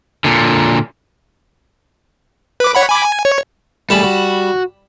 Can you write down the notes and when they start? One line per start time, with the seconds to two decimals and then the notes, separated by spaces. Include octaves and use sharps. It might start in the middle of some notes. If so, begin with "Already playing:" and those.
0.24 A#2 D3
2.60 B4 D6
2.75 C#5 F#5 B5
2.89 G#5 B5 D6
3.06 G#5
3.25 C#5
3.90 G3 A3 G#4 A5 B5
4.03 F#4